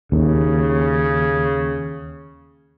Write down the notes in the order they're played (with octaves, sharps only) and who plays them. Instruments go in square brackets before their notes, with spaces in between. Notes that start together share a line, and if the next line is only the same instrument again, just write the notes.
[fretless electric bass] D#2 [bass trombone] C#3